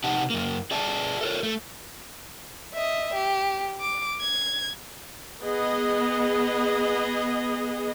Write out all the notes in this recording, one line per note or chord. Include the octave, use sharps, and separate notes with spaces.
C3 D#4 G4 F#5 A5
F#2 A#3
G#4 D5 E5 A5
A4 A#4 C#5
A3
D#5 E5
G4
D6
G#6
B3 G#4 D#5